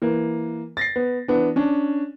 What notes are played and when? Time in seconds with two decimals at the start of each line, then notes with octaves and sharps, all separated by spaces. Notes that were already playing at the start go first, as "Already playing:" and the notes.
0.02 E3 A#3
0.77 A6 A#6 C7
0.96 B3
1.28 E3 B3 D4
1.56 C#4 D4